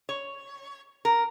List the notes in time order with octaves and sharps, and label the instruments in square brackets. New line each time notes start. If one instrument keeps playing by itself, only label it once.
[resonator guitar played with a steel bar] C#5
A#4